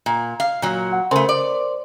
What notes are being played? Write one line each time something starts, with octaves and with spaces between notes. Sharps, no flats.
A#2
F5
A#2 F#3
F#5
C#3 A3 A#4 C5 C6
D5